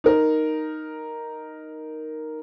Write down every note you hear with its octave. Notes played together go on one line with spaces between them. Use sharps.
D#4 A#4